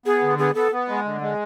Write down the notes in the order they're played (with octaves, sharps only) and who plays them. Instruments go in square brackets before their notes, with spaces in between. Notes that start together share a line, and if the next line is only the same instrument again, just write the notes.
[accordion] B3 [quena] G#4
[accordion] D3
[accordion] B3 [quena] G#4
[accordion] B3 [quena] A4
[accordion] B3
G#3
D3
G#3